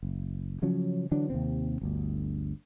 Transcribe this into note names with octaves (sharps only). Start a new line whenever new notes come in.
F#1
C#3 F3 F#3 C#4
D3 E3 F#3 D4
D#2 C3 C4
G1 D2